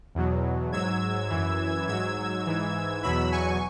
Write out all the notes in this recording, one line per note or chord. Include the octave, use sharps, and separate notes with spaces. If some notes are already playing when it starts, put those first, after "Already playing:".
E2 B2 F#3
G#2 F#3 E6 G#6
F#2 E3
G#2 F#3 E6 G#6
G#2 E3
E2 B2 F#3 B5 E6
G#5 C#6